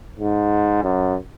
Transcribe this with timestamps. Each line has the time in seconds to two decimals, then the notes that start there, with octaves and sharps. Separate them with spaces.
0.20 G#2
0.83 F#2